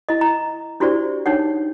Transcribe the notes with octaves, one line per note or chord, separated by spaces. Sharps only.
E4 D#5
A#5
D4 E4 F#4 G4 C5 D5
D4 D#4 C#5 F#5